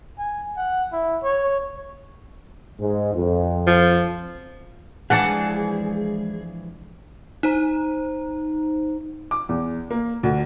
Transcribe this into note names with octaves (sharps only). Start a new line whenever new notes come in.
G#5
F#5
E4
C#5
G#2 G#3
F2
F3
E3 F3 G#3 D4 G#4 F#5 A5
D#4 C5 A#5
D6
E2
A#3
D2